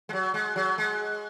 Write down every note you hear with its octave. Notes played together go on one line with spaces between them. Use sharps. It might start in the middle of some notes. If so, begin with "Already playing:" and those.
G#3
F#3
G#3
F#3
G#3